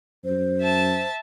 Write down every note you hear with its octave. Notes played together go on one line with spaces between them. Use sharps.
F#2 C5
E5 A5